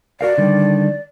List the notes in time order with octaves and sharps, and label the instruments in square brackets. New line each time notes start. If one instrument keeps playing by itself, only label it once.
[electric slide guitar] F#4 A#4 F5 [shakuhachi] D5
[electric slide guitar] D3 D#3 G3